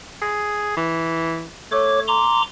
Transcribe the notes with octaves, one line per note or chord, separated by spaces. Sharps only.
G#4
E3
A3 C#5 D6
A#5 C6 D6